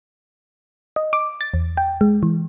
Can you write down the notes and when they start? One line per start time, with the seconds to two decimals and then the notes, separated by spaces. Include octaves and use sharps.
0.96 D#5
1.13 D6
1.41 A6
1.54 E2
1.77 G5
2.01 G#3
2.23 E3